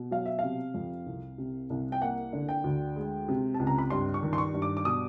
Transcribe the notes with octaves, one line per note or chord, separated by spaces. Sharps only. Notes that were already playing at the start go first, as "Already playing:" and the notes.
Already playing: B2
F#3 F5
E5
C3 F5
F2
C2
C3
C2
G5
A#3 F#5
D3
G5
D2
G#3
C3
A5
C#2
A#5
B5
G2 C6
C#6
D#3
C6
C#6
G2
D6
D6
B2 D#6